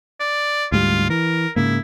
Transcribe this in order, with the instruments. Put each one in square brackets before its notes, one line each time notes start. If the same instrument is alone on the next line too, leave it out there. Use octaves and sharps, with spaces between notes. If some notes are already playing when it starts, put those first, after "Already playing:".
[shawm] D5
[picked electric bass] D2 G#2 G3 [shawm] F4
[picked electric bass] E3 [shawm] A#4
[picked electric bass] G#2 C#3 A#3 [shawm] E4